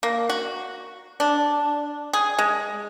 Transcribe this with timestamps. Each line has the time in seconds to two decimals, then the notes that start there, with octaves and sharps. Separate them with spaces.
0.03 A#3
0.29 F#4
1.20 D4
2.13 G#4
2.39 G#3